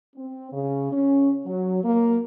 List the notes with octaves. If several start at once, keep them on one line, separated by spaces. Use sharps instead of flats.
C4
C#3
C#4
F#3
A#3